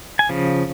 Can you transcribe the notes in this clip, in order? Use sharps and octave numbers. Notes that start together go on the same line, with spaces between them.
G#5
C#3 F3